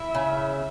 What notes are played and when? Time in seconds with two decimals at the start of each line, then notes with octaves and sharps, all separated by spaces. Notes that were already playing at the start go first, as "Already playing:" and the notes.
Already playing: E4 E5
0.15 C#3